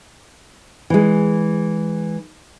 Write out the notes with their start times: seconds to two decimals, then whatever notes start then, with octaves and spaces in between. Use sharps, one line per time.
0.90 E3 G#3